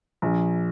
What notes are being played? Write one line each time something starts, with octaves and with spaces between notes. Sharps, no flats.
A#1